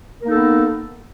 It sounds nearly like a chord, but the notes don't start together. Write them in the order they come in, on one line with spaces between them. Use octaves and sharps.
A#4 A#3 D#4 A4 B3